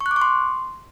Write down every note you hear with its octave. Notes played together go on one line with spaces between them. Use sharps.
C#6
F#6
D6
C#6
C6